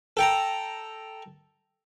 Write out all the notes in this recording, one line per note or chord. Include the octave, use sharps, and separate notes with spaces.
A4 G5 A#5